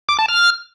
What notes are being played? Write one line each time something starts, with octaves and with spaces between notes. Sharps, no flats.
D6
A5
F6